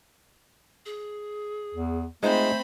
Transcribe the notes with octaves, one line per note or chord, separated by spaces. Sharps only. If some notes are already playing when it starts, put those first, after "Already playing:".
G#4
E2
G#3 A3 C4 D#4 F4 C5 B5